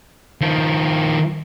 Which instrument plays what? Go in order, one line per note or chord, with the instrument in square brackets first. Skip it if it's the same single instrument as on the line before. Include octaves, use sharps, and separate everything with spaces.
[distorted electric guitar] D#3 F3